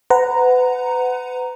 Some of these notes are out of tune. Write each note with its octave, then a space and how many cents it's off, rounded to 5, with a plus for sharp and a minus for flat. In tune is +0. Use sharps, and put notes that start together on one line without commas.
B4 +35 F#5 +0 A#5 +0